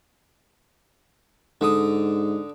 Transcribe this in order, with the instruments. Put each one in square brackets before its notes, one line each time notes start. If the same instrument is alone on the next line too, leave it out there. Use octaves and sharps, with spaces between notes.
[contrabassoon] G#2 [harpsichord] D3 D#6